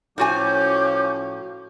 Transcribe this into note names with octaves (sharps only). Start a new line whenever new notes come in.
A2 F3 C#4 F#4 G#5 D6 G6